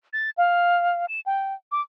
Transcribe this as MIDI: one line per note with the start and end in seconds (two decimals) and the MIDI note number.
0.13 0.30 93
0.38 1.06 77
1.08 1.20 100
1.26 1.54 79
1.72 1.81 86